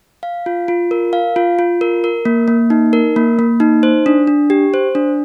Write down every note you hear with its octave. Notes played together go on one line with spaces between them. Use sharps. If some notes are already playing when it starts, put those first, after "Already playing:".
F5
F4
F4
A#4
F5
F4
F4
A#4
A#4
A#3
A#3
D#4
A#4
A#3
A#3
D#4
C5
D4
D4
G4
C5
D4